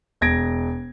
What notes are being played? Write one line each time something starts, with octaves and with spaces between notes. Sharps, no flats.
E1 G#6 A#6 D7